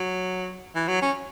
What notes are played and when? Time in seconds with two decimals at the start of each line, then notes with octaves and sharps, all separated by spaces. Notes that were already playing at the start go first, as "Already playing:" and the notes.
Already playing: F#3
0.75 E3
0.88 F#3
1.02 C#4